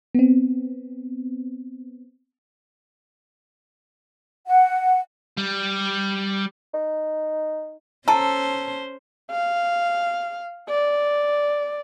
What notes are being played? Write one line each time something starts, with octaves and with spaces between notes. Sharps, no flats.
B3 C4
F#5
G3
D#4
C#4 A4 C5 A5 A#5
F5
D5